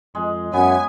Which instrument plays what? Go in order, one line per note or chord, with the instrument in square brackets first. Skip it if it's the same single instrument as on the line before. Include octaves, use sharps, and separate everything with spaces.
[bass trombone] F2 [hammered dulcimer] G#3
[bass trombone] F#2 [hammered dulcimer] B3 [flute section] C#5 E5 F#5 [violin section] G#5